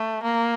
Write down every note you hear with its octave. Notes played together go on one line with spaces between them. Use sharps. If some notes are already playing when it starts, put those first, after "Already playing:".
Already playing: A3
A#3